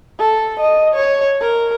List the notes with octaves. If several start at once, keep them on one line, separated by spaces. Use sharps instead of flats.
A4
D#5
C#5
A#4